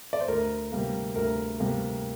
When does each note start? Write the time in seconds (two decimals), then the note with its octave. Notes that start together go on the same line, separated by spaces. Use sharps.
0.13 D5
0.20 C5
0.28 D2 A#4
0.72 C3 G3 A#3
1.15 D2 A#4
1.59 C3 G3 A#3